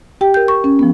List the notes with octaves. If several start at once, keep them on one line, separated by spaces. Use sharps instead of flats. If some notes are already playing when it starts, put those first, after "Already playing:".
G4 G5
A#4 G6
C#6
C#4
F3 B3